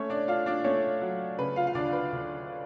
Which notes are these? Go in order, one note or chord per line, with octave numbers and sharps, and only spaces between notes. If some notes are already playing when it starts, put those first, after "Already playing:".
Already playing: A3 C#4 C#5
D4 D5
D4 F4 F5
D4 D5
A3 C#4 C#5
F#3
C#3 B4
F4 F5
F5
D2 D4 D5
B4
D2